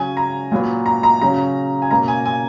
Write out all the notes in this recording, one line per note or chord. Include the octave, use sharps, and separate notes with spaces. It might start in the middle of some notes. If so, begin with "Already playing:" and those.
Already playing: C#3 F#3 C#4 G#5
A#5
A#2 F#3 B3
A#5
A#5
C#3 F#3 C#4 A#5
G#5
B2 A#3 C#4 A#5
G#5
G#5